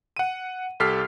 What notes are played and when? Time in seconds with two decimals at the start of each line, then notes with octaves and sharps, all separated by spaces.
0.17 F#5 D#7
0.80 C2 G4 A4 F6 B6 C7